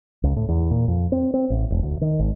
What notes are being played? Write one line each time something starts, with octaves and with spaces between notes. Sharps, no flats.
C#2
A2
E2
A#2
F2
C4
C4
A1
E1
D2
D#3
G#1